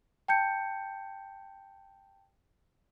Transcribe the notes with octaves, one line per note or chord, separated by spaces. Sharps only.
G5 A5 G6 C#7